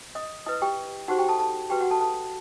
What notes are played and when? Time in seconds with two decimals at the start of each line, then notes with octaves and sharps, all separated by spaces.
0.15 D#5 D#6
0.46 E4 B4 D#5 D#6
0.62 G4 G5
1.08 D#4 F#4 G4 C5 F#5
1.18 G4 G5
1.29 A4 A5
1.39 A4 A5
1.70 F#4 G4 B4 G5
1.81 F#4 F#5
1.91 A4 A5
2.01 A4 A5